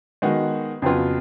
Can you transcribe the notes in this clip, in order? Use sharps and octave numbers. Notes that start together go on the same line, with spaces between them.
D#3 G#3 B3 F#4
F2 C#3 F#3 B3 F4